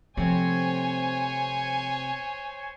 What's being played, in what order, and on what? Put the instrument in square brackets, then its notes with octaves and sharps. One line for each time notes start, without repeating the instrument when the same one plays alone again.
[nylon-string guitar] C3 A3 C4 [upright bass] F3 [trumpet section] C5 C#5 [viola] G#5